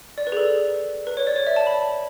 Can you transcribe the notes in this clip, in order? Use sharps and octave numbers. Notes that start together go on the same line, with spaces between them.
D5
B4
G#4
A4
B4
C#5
D5
C#5
E5
A5
B5